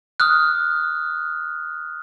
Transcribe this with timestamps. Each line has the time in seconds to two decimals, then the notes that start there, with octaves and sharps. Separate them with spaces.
0.20 D#6 F6 F#6